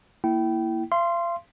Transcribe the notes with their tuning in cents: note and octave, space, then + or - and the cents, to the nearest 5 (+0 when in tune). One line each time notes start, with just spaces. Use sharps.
A#3 -5 E4 +0 G5 -25
F5 -40 C6 +0